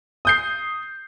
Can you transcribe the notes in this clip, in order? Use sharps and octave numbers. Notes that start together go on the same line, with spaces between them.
D#6 G6 C7